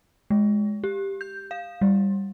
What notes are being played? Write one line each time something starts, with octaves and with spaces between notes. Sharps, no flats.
G#3
G4
G6
F5
G3